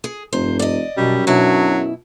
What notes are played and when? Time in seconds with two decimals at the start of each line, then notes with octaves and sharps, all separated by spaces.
0.04 G#4
0.33 F1 G2 C5
0.59 D5 D#5
0.97 F#2 B2 G3
1.27 B2 F#3 D4 E4